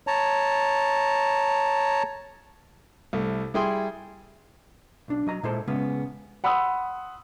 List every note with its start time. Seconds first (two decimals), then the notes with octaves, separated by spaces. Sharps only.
0.07 C#5 A5 A#5
3.13 C2 A3
3.54 G3 E4 G#4 G5 C6
5.08 B1 D4
5.27 F#3 D#5 A#5
5.43 A#2 G#3 E4 A4 C5 A5
5.67 C#3 G#3 A3 B3 C#4
6.44 F#5 B5 C6 D#6 E6